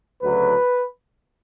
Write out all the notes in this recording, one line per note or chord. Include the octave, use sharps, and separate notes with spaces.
D2 C#3 F#3 B4